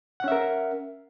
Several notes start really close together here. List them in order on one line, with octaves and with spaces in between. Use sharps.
F#5 C#4 E5 A#4